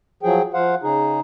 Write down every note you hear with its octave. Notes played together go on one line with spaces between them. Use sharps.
F3 F#3 G#4 G5
F3 C5 F5 F#5
C#3 D#4 G#4